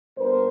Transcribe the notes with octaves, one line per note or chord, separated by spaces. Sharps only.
A#2 G3 B3 D4 A#4 C5